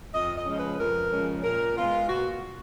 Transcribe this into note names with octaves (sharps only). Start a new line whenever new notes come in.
F2 D#5
D#5
C#3 F3 G#3 C#4
B4
F2 A#4
C#3 F3 G#3 C#4
A#2 A#4
G#3 B3 F4
A#2 F#4